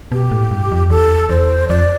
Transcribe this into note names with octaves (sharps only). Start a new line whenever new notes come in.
B2 G4
A2
G2
F2
E2 A4
E2 C5
F2 D5